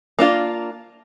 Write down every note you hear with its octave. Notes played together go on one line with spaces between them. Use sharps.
A#3 D4 F4